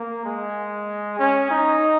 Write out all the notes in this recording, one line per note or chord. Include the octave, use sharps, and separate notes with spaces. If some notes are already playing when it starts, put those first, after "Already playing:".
Already playing: A#3
G#3
C#4
D#4